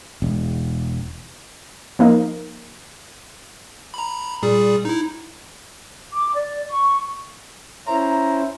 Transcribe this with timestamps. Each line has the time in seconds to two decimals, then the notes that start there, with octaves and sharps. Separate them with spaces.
0.22 E1
1.99 F3 A#3 D#4
3.94 A#5 B5
4.42 A#2 G3 G#4
4.85 D#4 E4
6.12 D6
6.34 D5
6.69 C#6
7.87 C#4 E4 C5 A#5